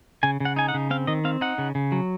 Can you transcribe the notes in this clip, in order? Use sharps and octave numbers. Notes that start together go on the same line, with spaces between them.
C#3 G#5
C#3 F#5
D#4 G#5
F#5
C#3
C4 F5
D#3 D#5
C4 F5
D#4 F#5
C#3
C#3
F#3